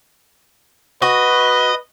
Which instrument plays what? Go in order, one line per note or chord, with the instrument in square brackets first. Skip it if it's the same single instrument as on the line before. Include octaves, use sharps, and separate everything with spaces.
[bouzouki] F#4 [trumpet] B4 [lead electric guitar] D#5